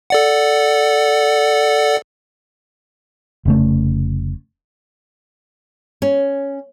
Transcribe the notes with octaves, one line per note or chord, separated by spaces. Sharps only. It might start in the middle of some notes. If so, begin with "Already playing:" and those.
A4 D5 F#5
F1 C#3 A3
C#4